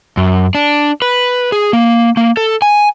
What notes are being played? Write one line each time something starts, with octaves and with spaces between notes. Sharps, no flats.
F#2
D4
B4
G#4
A#3
A#3
A4
G#5